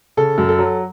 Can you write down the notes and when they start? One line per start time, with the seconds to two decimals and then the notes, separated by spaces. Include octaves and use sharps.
0.17 C#3 A4
0.38 F#2
0.49 A4
0.59 F#3